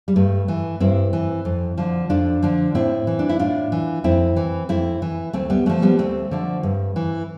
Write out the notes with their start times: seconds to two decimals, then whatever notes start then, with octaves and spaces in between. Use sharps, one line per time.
0.08 G3
0.16 G2 A3
0.48 E3
0.80 G2 C4 E4
1.13 E3
1.45 F2
1.77 D3 F3
2.10 F2 D4 F4
2.43 D3 F3
2.75 A2 C4 E4
3.07 E3
3.19 D4
3.29 E4
3.39 A2 D4 F4
3.72 E3
4.04 F2 C4 E4
4.36 E3
4.69 F2 C4 E4
5.02 E3
5.33 D2 A3 C4
5.50 G3 B3
5.66 D3 F3 A3
5.82 G3 B3
5.98 D2 A3 C4
6.31 D3 F3
6.63 G2
6.96 E3